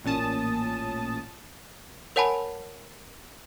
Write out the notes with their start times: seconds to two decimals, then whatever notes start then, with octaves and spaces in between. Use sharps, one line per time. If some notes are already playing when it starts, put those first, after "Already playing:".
0.04 A1 A#2 C#4 A5 D#6
2.16 A#4 C#5 F#5 G#5 A5 B5